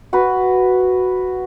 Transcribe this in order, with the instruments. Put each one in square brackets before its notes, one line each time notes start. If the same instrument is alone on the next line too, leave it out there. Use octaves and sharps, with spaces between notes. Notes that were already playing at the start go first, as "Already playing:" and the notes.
[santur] F#4 B4